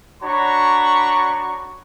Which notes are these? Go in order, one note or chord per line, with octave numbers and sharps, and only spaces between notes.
D4 F#4 C#5 A#5 B5 C#6